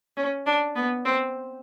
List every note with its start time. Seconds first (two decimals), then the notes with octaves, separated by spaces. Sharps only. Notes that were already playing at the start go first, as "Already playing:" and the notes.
0.17 C#4
0.46 D4
0.76 B3
1.05 C4